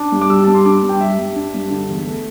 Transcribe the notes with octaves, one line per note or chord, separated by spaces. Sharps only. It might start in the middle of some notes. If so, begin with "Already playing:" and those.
Already playing: D4
G2
D6
G3 E6
G2 A5
C6
D4 D6
G2
G5
G3 E5
G2
D4
G2
D3
E2
A3